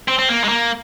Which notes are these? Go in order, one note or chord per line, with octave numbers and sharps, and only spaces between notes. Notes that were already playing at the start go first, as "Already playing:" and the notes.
C4
C4
A#3
G#3
A#3